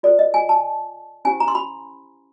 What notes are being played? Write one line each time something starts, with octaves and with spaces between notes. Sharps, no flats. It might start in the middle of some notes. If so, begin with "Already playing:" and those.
F4 A4 C5 D5
D#5
G#5
A5
C#4 E4 G4 C5 G#5
A#5
C6
B5